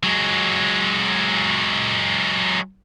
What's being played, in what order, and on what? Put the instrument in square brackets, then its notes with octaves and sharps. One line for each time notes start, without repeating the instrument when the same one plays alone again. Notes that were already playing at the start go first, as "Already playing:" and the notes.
[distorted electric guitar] F#3 G#3